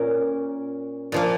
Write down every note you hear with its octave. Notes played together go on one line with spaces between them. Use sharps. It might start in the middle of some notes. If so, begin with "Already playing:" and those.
Already playing: A#2 C#4 A#4
A#2 F3 A#3